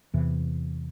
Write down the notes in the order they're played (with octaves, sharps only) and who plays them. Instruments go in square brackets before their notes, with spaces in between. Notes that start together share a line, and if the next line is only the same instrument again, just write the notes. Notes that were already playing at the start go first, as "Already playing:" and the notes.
[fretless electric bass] E2 C3 E3